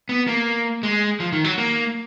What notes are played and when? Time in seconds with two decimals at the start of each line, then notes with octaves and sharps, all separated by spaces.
0.09 B3
0.27 A#3
0.83 G#3
1.20 F3
1.33 D#3
1.44 F#3
1.58 A#3